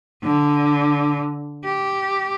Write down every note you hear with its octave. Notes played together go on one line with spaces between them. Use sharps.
D3
G4